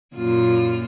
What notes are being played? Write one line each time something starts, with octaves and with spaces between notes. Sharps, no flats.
F#2 A#2 F4